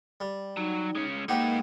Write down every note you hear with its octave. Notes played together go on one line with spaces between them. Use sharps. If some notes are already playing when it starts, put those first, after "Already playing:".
G3
F#3 D#4
G#3 C#4
G#3 A#3 D#4 F#4 G4 B4